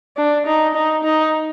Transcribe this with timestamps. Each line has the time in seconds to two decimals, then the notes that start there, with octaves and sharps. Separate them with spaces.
0.17 D4
0.46 D#4
0.75 D#4
1.04 D#4